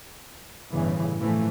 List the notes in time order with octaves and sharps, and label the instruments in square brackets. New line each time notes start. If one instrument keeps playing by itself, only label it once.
[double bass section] G1 A2 C#3 E3
A2 E3 F3 A3